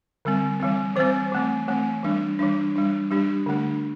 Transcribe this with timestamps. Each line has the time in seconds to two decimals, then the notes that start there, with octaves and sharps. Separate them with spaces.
0.25 D3 G3 C4
0.60 E3 G3 C4
0.96 E3 G3 C4 C5
1.32 E3 A3 C4
1.68 E3 A3 C4
2.03 E3 G3 D4
2.39 E3 G3 D4
2.75 G3 D4
3.11 G3 D4 G4
3.46 D3 A3 D4